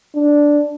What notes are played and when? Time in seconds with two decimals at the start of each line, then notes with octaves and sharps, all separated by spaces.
0.15 D4